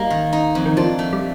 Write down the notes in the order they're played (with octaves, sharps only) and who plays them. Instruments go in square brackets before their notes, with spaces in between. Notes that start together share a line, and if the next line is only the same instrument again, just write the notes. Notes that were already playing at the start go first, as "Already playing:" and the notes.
Already playing: [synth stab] G3 [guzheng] A#3 D#4
[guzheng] D#3
D#4
F2
[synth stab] D#3
[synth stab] F3 [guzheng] D4
[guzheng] A3
[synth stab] G3